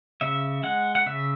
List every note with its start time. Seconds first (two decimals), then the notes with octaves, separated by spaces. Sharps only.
0.21 C#3 E5
0.63 G#3 F#5
0.95 F#5
1.06 C#3 E5